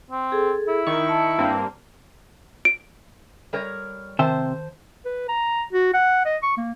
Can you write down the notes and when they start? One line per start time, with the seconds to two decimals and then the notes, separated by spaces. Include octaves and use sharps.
0.11 C4
0.32 G#4 A4
0.68 E4
0.87 D#3 D#4 C#6
1.09 A5
1.38 G2 A#3 C4
2.65 D7
3.53 G3 A#4 C#5
4.19 C3 D#3 C5 E5 G5 A5
5.05 B4
5.28 A#5
5.73 F#4
5.93 F#5
6.26 D#5
6.43 C#6
6.57 A#3